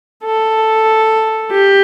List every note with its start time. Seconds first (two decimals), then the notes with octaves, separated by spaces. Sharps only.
0.24 A4
1.51 G4